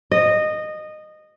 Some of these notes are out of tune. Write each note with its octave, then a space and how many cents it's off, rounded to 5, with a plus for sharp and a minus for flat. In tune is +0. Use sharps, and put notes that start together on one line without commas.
D#5 -15